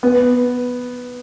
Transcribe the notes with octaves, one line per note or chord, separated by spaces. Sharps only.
B3